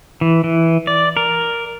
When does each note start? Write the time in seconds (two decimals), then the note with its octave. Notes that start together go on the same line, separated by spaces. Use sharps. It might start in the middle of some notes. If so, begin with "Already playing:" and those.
0.21 E3
0.44 E3
0.87 D5
1.17 A#4